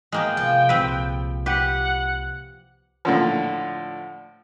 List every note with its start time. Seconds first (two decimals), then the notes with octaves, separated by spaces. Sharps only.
0.12 G#3 A#3 B3 G5
0.37 C3 F3
0.69 C2 A#2 C4 B4
1.46 G4 B4 F#5
3.05 A2 D3 F3